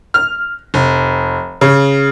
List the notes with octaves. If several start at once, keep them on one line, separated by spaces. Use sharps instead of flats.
F6
F1
C#3